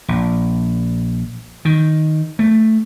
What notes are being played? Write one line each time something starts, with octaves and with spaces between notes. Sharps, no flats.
A#1
D#3
A3